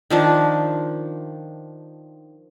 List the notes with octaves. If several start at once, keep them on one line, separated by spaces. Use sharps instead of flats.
D#3 F3 D4